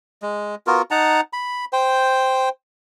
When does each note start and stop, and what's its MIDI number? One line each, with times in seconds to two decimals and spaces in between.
0.22 0.55 56
0.67 0.82 59
0.67 0.82 65
0.67 0.82 66
0.67 0.82 70
0.91 1.21 63
0.91 1.21 78
0.91 1.21 81
0.91 1.21 82
1.33 1.65 83
1.73 2.49 72
1.73 2.49 79